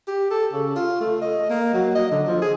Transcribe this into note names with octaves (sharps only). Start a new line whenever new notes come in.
G4
A4
C#3
F4
A3
D#5
A#3
F#3
D#5
D3
F3
G#4